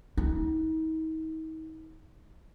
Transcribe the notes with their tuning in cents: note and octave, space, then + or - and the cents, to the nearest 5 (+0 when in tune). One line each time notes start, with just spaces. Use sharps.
D#4 +40